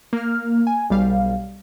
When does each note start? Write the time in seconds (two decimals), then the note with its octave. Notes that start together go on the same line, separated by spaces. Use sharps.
0.13 A#3 F6
0.67 G#5
0.90 B1 G3 F5